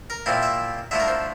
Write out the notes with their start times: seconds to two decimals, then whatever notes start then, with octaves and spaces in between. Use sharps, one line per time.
0.10 A#4
0.26 A#2 F3 C4 E4
0.42 E5
0.91 D3 F3 A3 E4 E5
1.00 A#4
1.08 C5